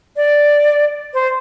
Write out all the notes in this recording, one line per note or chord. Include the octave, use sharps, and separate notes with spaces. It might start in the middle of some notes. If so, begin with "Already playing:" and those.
D5
C5